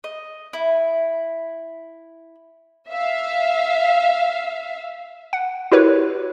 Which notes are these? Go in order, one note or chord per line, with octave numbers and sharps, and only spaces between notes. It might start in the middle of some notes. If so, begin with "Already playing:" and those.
D#5
E4
E5 F5
F#5
E4 F#4 G4 A#4 B4 C#5